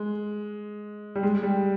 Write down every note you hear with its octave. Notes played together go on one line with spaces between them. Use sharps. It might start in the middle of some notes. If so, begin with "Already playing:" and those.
Already playing: G#3
G3
G#3
G3